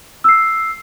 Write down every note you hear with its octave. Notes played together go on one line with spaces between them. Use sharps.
E6 C7